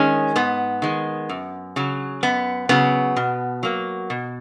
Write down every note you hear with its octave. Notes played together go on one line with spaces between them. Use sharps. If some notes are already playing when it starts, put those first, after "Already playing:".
Already playing: D#3 G#3 C#4
G#2 B3
D#3 G#3
F#2
C#3 F#3
F#2 B3
C#3 F#3 B3
B2
F#3 A#3
B2